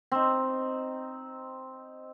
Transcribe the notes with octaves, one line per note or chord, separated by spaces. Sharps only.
C4 D#4